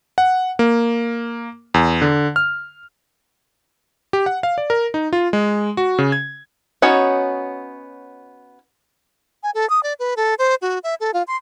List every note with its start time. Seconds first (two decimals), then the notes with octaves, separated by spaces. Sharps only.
0.18 F#5
0.59 A#3
1.74 E2
2.02 D3
2.36 F6
4.13 G4
4.26 F#5
4.43 F5
4.58 D5
4.70 A#4
4.94 D#4
5.13 F4
5.33 G#3
5.77 F#4
5.99 C#3
6.12 G#6
6.82 B3 C#4 D#4 F#4 C#5
9.43 G#5
9.55 A4
9.70 D#6
9.83 D5
9.99 B4
10.17 A4
10.39 C5
10.62 F#4
10.84 E5
11.00 A4
11.14 F4
11.27 C6